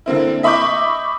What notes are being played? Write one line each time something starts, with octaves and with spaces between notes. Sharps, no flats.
D3 A#3 C4 E4
D#5 E5 B5 C#6 D6 G6